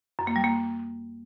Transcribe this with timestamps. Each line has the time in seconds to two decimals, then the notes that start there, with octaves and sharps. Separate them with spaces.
0.19 F#2
0.27 A#3
0.36 G3
0.44 A#3